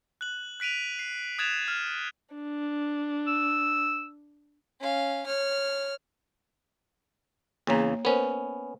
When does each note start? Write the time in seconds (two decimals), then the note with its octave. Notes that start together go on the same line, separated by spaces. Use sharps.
0.21 F#6 F#7
0.60 F#6 B6 D7 D#7 F7
0.99 C7
1.38 D#6 F#6 G#6 A6 E7 F7
1.68 F6
2.35 D4
3.27 E6
4.80 C#4 F5
5.26 C#5 F6
7.67 E2 C#3 A#3 C#5 A#5
8.05 B3 C#4 A#4 C5